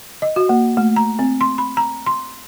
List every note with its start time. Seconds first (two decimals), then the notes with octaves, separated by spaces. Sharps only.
0.22 D#5
0.36 F#4
0.49 A#3
0.77 A3
0.96 A#5
1.19 C4
1.41 C6
1.58 B5
1.77 A#5
2.06 C6